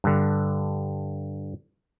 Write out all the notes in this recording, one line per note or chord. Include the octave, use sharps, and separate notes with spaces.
G2 D3